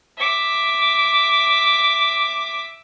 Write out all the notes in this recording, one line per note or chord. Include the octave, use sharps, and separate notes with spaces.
E5 D6